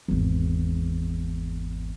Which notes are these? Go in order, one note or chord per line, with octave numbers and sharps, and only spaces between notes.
G#1 E2